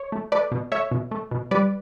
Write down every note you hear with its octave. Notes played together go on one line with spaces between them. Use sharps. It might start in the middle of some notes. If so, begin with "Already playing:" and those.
Already playing: C#5
A3
A3 B4 D5
B2
A3 C#5 E5
B2
A3
B2
G3 B4 D5